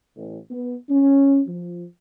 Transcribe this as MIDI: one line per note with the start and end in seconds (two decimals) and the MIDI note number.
0.16 0.37 33
0.50 0.75 59
0.89 1.39 61
1.46 1.84 53